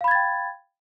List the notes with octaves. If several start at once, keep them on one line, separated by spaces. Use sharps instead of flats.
F5 G5 B5 G#6 A6